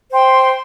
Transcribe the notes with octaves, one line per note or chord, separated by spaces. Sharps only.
C5 G5 C6